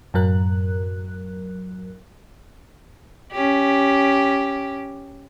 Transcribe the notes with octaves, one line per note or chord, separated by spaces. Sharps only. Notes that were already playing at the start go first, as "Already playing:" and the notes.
F#2 A2 F#3 A#4 F#6
C#4 G4